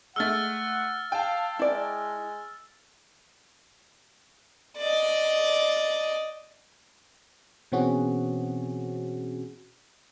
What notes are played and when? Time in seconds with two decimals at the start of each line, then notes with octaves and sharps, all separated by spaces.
0.16 G#3 A3 F#5 E6 F6 A6
1.12 F5 G5 A5
1.59 G#3 E4 D5
4.78 D5 D#5
7.72 B2 E3 C4 C#4 F#4 G#4